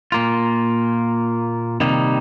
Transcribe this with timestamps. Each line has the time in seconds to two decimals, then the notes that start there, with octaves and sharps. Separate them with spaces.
0.12 A#2 A#3 F4
1.80 C3 D#3 G3 A#3 D#4